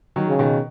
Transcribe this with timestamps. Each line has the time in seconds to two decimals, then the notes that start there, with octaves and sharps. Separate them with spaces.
0.16 D#3 F#3
0.28 C#3
0.39 B2 D#3